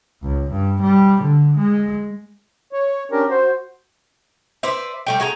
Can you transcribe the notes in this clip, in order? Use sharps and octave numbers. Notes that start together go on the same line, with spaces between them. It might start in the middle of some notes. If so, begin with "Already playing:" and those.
C#2
G2
G3
D3
G#3
C#5
C#4 D4 G4 A#4
F#4 C5
B4 C5 D5 E5
G3 A3 G5
F#4 G#4 G5 A#5